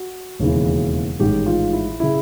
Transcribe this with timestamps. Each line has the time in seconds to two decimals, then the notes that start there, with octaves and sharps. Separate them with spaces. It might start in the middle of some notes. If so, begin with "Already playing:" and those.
Already playing: F#4
0.39 E1 D#2 C#3 E3
1.19 A1 G#2 D#3 G4
1.46 F4
1.73 E4
2.00 C#3 E4